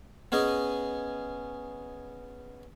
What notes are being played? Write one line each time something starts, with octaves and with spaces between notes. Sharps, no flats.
B3 C#4 G#4 D#5